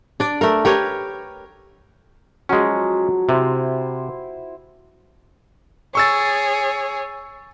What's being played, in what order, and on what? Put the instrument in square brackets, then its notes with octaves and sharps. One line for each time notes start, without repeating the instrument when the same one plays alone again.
[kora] D4 D5
A3 A#4
G4 A#4 B4 C#5
[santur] F3 F#3 [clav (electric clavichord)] G#3 C#4
[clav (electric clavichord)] C3 [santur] E4 C5
[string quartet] G#4 C#5 [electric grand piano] C#6 E6 A6